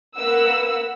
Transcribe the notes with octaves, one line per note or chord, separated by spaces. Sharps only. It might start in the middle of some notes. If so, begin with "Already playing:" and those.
A#3 B4 F#5 E6